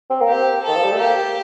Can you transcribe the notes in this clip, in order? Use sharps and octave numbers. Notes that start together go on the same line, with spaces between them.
C4
A#3
C4 G4
D#3 A4
F3
G3
A3
A#3 G4